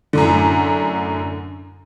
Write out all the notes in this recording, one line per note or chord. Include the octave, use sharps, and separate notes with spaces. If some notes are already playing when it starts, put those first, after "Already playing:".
F#2 A2 D3